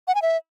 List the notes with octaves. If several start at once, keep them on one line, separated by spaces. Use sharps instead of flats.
F#5
G#5
E5